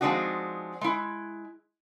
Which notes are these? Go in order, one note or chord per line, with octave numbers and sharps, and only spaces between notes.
F3 G#3 C4 D4 D#4 F#4
G#3 E4